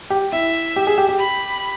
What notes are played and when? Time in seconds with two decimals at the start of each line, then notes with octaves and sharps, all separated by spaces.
0.10 G4
0.33 E4 E5
0.76 G4
0.87 G#4
0.98 G4
1.09 G4
1.19 B5